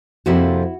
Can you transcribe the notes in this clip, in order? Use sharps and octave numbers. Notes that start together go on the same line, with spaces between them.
F2 C3 F3 A#3 E4 F#4